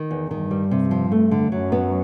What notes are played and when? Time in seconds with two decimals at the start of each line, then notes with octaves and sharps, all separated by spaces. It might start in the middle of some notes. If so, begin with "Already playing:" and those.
Already playing: D#3
0.11 E2
0.31 G2 D#3
0.51 G3
0.71 C3
0.91 F3
1.12 A3
1.31 D3
1.52 F#2 F#3
1.72 B3